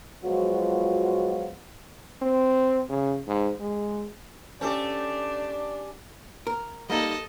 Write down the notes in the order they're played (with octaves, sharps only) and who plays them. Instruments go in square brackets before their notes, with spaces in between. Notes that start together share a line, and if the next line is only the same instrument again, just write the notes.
[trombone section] F3 F#3 G#3 B3 F4 F#4
[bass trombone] C4
C#3
G#2
G#3
[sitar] A3 A4 [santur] C#4 G4 [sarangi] D4
[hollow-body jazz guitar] A#4
[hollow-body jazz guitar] G3 A#3 D#4 [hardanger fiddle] A4 D#5